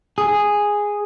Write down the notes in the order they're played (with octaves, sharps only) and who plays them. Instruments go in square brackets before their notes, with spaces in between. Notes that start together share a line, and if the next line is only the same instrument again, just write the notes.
[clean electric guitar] G#4